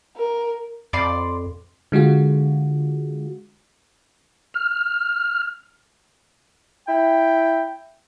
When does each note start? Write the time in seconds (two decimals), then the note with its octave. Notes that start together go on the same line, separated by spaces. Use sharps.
0.17 A#4
0.93 F2 D5 B5 C6
1.92 D3 G#3 F4 F#4
4.54 F6
6.88 E4 G5